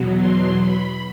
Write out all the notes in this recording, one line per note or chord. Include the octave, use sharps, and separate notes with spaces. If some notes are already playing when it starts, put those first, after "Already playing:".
Already playing: E2 B2 F#3
C6
B5